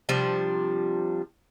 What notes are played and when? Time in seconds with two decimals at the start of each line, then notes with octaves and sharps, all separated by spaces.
0.09 C3 F3 G3 D4